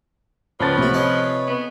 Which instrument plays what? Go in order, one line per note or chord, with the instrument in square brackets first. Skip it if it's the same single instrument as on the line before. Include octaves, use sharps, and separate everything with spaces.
[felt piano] C#2 A5 A6 [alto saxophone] F3 [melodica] B4 C#5 B5
[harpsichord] A1 F#4 [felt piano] C3
[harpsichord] C#4 A4 D#5
[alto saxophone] B3